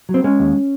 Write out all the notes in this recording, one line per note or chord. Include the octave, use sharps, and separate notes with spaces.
F#3
C4
G#3 C#4
D#2